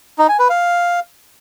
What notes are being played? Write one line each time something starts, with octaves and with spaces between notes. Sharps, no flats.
D#4
G#5
B4
F5